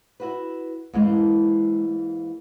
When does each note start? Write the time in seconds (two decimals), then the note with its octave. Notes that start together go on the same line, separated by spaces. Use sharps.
0.20 E4 F#4 B4
0.93 G#2 E3 G#3 A#3 C#4